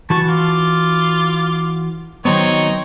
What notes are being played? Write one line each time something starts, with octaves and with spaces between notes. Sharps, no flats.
E3 F#4 A5 C#6
F4 D6
D#3 F#3 B3 C4 D#4 C#5